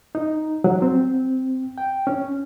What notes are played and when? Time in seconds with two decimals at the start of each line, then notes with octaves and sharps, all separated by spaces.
0.15 D#4
0.64 F#3
0.82 C4
1.78 G5
2.07 C#4